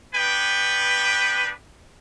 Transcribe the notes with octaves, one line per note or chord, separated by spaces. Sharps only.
B3 D4 B4 G5